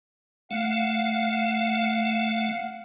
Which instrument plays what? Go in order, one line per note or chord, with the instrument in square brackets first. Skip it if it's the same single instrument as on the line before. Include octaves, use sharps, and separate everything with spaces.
[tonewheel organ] A3 [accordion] F5 F#5